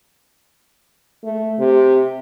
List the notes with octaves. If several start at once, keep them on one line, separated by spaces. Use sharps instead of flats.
A3
C3